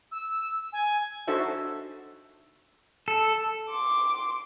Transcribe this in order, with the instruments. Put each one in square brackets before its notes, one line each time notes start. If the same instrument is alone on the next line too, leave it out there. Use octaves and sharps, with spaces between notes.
[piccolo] E6
G#5
[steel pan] D4 D#4 F#4 A4 C5 E5
[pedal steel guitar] A4
[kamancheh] C6 D6